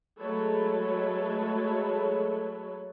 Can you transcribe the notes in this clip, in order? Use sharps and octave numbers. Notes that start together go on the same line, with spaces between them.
F#3 G#3 A3 A4 B4 C#5